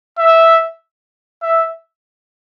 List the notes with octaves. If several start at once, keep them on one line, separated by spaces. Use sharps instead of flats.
E5
E5